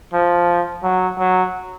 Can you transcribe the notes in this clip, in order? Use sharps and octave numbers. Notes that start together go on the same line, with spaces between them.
F3
F#3
F#3